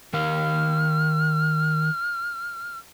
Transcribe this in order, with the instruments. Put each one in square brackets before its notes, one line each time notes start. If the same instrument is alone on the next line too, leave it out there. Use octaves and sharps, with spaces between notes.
[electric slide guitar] D#3 A#4 F5 [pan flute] F6